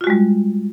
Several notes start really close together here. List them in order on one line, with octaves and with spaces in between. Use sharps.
F4 F#4 G#3 G3